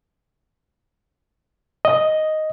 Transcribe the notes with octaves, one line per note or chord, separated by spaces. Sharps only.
D#5